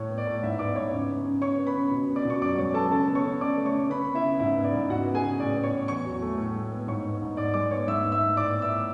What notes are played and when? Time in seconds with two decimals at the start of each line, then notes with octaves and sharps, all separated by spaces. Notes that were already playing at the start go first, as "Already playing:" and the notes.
Already playing: A2 C#5
0.10 B3
0.18 D5
0.27 A2
0.43 G#2 E4 E5
0.59 B3 D5 D6
0.76 G#2 C#5 C#6
0.92 C#3
1.09 B3
1.25 C#3
1.41 C#3 C#5 C#6
1.58 B3
1.67 B4 B5
1.75 C#3
1.91 B2
2.08 B3
2.16 D5 D6
2.25 B2 C#6
2.41 F#2 D5 D6
2.58 G#3 C#5 C#6
2.74 B3 A4 A5
2.90 C#3 A4 A5
3.08 B3
3.15 C#5 C#6
3.24 C#3
3.40 C#3 D5 D6
3.57 A3
3.66 C#5 C#6
3.73 C#3
3.90 C#3 B4 B5
4.07 B3
4.15 E4 E5
4.23 C#3
4.39 G#2 E4 E5
4.57 B3
4.64 D5
4.74 G#2
4.89 C#3 F#4 F#5
5.06 B3
5.15 G#4 G#5
5.23 C#3
5.40 A2 D5
5.55 B3
5.63 C#5 C#6
5.73 A2
5.88 E2 C#5 C#6
6.05 F#3
6.22 A3
6.38 A2
6.55 G#3
6.72 B3
6.87 G#2 C#5 C#6
7.05 B3
7.22 G#2
7.37 G#2 D5 D6
7.54 G#3 D5 D6
7.71 B3 C#5 C#6
7.87 G#2 E5 E6
8.04 B3
8.12 E5 E6
8.20 G#2
8.36 A2 D5 D6
8.54 B3
8.62 E5 E6
8.70 A2